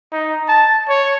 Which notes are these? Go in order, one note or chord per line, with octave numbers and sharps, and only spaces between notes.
D#4
A5
C#5